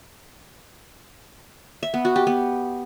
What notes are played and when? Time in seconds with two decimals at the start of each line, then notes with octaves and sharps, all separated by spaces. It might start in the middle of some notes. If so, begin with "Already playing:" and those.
1.83 E5
1.94 B3
2.05 F#4
2.16 G4
2.27 B3